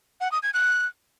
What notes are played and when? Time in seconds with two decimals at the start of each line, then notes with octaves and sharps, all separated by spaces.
0.21 F#5
0.32 D#6
0.43 G#6
0.54 F#6